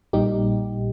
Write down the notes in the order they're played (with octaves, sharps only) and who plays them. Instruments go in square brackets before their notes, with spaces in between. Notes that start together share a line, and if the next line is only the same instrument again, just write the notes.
[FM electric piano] A#1 A#2 G3 D#4 G4